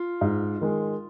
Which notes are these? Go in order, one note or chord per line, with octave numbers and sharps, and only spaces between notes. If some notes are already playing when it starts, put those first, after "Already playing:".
Already playing: F4
G#2
D#3 G#3